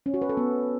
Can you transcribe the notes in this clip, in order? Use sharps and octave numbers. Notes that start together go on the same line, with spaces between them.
C#4
F#4
B4
A4
B3